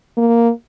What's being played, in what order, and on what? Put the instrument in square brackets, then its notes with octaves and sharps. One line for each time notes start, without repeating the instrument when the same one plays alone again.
[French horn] A#3